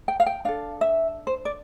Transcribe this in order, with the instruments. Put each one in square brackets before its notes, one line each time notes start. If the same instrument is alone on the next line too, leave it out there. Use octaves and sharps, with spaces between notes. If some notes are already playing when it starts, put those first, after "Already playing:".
[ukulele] G5
F5
G5
D4 A4 F5
E5
C5
D5